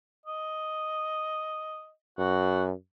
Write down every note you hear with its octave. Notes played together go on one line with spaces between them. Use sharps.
D#5
F#2 F#4